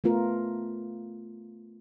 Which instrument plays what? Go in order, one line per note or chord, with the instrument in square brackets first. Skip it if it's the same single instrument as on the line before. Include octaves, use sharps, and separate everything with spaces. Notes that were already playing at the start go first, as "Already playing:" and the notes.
[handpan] A3 B3 F4 A#4